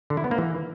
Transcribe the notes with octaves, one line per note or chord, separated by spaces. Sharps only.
D3
E4
B3
A#3
E3